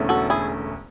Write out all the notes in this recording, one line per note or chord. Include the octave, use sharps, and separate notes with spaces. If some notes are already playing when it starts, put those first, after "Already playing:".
Already playing: E1 E2 D3 A3 C#4
F#4 A4
E4 G#4